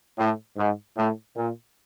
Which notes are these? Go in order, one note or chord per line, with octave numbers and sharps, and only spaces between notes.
A2
G#2
A2
A#2